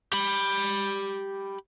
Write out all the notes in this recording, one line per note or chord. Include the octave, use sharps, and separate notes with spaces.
G4 B5